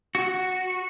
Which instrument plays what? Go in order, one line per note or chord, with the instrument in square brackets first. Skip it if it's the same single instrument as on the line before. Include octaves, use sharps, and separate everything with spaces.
[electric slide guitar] F#4